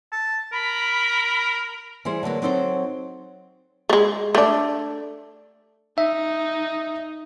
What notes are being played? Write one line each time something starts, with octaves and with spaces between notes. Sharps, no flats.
A5
A#4 B5
E3 G3 G#4 C5
D3 F#3 A#3 B3
F#3 C4 D#4 A4 B4 C5
G#3 A3
A3 D4
D#4 E5